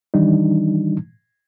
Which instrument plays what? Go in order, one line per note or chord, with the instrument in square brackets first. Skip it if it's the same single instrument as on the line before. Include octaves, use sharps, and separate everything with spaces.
[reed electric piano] D#3 E3 G3 D4 D#4